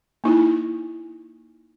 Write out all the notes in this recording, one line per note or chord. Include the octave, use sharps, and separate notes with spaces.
A#3 D#4 E4